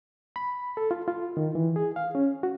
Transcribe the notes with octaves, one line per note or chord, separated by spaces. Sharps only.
B5
A4
F4
F4
D#3
E3
G#4
F5
C#4
F#4